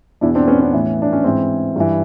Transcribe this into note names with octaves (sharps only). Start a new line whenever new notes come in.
E2 B2 D4 E4
C4 D4
B3 C#4
B3 C#4
A2 E3
D4
C#4
G#2 E3 C4
G2 E3